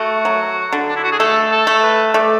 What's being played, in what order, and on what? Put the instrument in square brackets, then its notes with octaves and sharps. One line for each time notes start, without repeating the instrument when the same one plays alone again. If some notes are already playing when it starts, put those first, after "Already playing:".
Already playing: [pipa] A3 [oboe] F#4
[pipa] F#3
D3
[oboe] D4
E4
F#4
G#4
[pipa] A3 [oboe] A4
[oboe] A4
[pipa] A3
[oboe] B4
[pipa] A3 [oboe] D5